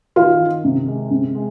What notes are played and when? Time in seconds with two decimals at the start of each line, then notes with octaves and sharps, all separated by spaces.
0.16 D#3 F4
0.40 D#3
0.64 C3
0.87 G#3
1.11 C3
1.35 G#3